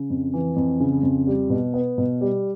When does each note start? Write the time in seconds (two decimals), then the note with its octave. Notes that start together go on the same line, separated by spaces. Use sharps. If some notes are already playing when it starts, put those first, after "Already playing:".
Already playing: C#3
0.10 F2
0.33 E3
0.56 F2
0.80 C#3
1.03 F2
1.27 G3
1.50 B2
1.74 B3
1.98 B2
2.21 G3